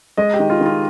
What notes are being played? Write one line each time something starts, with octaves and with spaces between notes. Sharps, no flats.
G#3 D#5
G4
D#3
F4
D#3
F4